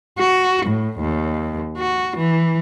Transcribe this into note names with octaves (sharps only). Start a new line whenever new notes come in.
F#4
A2
D#2
F#4
E3